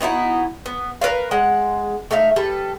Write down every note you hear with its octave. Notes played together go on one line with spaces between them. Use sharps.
B3 D#4 E4 F#4
B3
A#4 B4 D5 F5
G#3 F#5
A3 D#4 E5 F5
G3 A4 B4